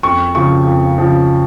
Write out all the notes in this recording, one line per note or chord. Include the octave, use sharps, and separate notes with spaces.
F2 C#6
C#3 F3 C#6
F2
C#3 F3